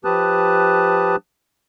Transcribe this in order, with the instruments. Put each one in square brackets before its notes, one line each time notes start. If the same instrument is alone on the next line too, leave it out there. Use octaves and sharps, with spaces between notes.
[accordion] F3 G4 B4 A5 D#6 F#6